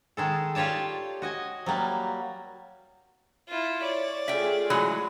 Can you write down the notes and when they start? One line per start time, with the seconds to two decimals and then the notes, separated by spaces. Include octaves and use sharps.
0.17 D#3 G#3 A4
0.55 F4 G4 C#5 D5 A5
1.22 F#4 D#5 G#5
1.66 F#3 G3 A#3
3.48 E4 F4
3.83 C#5 D5
4.28 A3 F4 G#4 E5 G5
4.70 E3 F#3 G#3